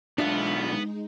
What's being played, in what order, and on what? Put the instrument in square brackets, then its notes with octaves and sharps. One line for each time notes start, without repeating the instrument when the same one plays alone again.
[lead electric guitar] B1 F4 [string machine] G#3 D#4 [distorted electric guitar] B3 B4 [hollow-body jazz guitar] D4 E5